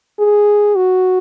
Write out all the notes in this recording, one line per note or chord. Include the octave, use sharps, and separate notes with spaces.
G#4
F#4